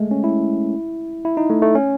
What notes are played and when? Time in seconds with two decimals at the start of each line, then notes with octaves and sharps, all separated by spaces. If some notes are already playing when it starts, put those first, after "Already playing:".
Already playing: G#3 A3
0.11 C#4
0.24 E4
1.25 E4
1.37 D#4
1.50 A3
1.62 A3
1.75 C#4